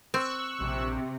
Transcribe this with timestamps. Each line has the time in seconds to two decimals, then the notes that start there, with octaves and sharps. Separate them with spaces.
0.14 C4 C#6 E6 F#6
0.61 A#1 C3